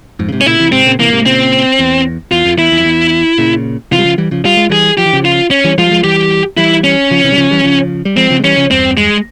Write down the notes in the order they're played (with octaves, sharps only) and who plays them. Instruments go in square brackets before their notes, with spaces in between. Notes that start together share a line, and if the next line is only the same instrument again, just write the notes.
[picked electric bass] F2 G#2
C#3
G#2 C3
[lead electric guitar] C#4
[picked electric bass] A#2 C#3 [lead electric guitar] E4
[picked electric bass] C3 E3
[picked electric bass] G#2 C3 [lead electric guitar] C4
[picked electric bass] A#2 C#3
[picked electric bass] C3 E3 [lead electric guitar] A#3
[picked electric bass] A#2
G#2 C3
[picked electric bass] A#2 C#3 [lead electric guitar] C4
[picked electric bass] E2
[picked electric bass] E2 [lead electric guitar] F4
[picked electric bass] F2
[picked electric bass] E2 [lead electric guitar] E4
[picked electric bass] E2
F2
E2
A#2 C#3
[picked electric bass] C3 E3 [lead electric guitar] F4
[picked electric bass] G3
C#3 F3
E3 G3
C#3 F3
[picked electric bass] G3 [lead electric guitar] F4
[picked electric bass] G#3
[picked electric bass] E3 G3 [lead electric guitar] G#4
[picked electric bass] F3 [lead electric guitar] G4
[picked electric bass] E3
C#3 F3
[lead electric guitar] F4
C#4
[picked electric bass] E3 G3
[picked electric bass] F3 G#3 [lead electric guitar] F4
[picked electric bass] G3
F3 G#3
[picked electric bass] E3 G3 [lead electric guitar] G4
[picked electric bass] E3 G3 [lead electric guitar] E4
[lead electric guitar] C#4
[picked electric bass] C#3 F3
C3 E3
G3
C#3 F3
E3 G3
C#3 F3
G3
[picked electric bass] F3 G#3 [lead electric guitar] C4
[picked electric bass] C#3 F3
G#3
[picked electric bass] E3 G3 [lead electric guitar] C#4
[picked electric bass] C#3 F3
[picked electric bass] E2 G2 [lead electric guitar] C4
[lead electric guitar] G#3